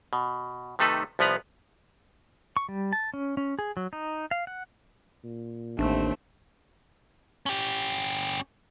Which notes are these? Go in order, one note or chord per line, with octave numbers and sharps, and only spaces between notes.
B2
C3 D#3 A3 D#4 A4 B4
C2 F3 B3 B4 A#5
C#6
G3
A5
C#4
C#4
G#4
F#3
D#4
F5
F#5
A#2
A1 D#2 A3 C4 D4
C#4 G4